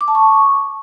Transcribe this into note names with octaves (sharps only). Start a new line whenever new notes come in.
D6
A5
C#6